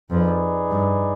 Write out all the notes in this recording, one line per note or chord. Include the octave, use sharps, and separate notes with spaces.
F2 D#4 G#4 B4 D5
G2